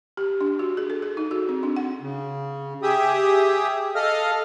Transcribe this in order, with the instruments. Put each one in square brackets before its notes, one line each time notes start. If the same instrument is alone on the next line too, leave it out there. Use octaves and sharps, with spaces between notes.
[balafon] G4
D4
F#4
G#4
A4
G#4
D#4
F#4
C4
D4
F#5
[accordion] C#3
G4 G#4 E5 G5 D#6
A4 D#5 F5 D#6 F6